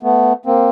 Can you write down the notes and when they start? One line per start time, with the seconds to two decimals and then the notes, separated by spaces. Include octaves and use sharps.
0.03 A3 B3
0.46 A#3 C4